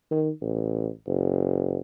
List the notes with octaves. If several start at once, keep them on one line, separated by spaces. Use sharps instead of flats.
D#3
A1
F#1